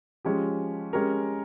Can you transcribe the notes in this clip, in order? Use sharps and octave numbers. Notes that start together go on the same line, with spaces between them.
F3 G#3 C#4 G4
G#3 C#4 G4 A#4